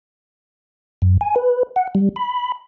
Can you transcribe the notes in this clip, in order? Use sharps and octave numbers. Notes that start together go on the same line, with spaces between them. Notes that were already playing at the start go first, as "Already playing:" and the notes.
F#2
G#5
B4
F#5
G3
B5